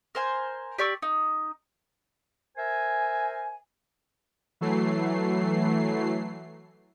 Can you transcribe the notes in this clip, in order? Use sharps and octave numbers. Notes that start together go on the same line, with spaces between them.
A#4 C5 G#5
G4 D5 C#6 E6
D#4
A#4 C5 E5 G#5
E3 F#3 A3 C7